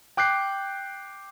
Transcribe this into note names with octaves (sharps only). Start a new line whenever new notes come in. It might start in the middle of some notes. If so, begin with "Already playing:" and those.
G5 D6 F#6 G6 C7